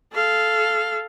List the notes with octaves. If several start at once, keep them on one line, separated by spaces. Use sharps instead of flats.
A4 F5